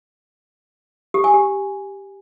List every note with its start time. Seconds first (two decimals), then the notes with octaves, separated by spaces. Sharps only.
1.14 G4
1.24 G#5
1.34 G4